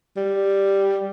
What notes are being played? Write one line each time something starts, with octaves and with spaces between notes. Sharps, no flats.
G3